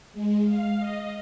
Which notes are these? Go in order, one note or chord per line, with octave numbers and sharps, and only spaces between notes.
G#3
F5
D#5